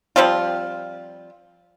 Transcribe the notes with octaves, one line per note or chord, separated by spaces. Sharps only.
F3 G3 C4 F4